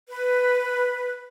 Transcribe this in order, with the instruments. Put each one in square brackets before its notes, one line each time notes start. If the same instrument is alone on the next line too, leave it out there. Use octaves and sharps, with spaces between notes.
[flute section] B4